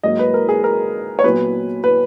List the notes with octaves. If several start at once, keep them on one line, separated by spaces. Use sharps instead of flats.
G#2 F#3 A#3 D#5
B4
A#4
G#4
A#4
C#5
A#2 F#3 B3 B4
B4